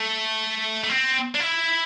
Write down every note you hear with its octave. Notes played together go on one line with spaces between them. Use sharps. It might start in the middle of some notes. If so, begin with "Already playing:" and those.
Already playing: A3
A3
C4
D4
E4